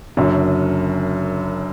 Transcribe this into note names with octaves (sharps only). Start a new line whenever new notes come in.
F#1 F#2 D3